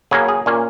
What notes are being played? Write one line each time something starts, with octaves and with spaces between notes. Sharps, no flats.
C#3 F#3 A#3 C#4 G#4
G#4
A#2 A#3 C#4